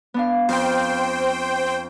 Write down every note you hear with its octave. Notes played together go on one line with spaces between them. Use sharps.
B3 D4 F5
F2 C5 G5 F6 G6